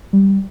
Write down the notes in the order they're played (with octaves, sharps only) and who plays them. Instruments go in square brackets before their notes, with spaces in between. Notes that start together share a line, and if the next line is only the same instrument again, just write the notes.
[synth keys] G3